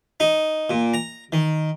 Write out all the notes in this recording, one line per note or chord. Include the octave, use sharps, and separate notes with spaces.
D#4
A#2
A#5
D#3